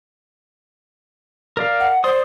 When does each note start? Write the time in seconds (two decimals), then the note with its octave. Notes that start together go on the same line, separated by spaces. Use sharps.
1.57 A#4 D5 F5
1.80 F#5
2.04 C5 D5 C6 D#6